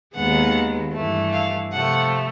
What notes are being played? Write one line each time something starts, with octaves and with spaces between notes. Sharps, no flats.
D#2 D#3 G#3 B3 F#5
G2 E3 A3
F5
C3 F3 A3 F#5